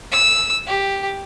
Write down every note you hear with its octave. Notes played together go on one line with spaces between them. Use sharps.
E6
G4